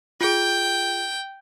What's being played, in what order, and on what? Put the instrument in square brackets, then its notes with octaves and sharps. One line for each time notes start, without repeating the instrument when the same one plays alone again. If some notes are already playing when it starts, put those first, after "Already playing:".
[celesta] F4 G#4 [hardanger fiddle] G5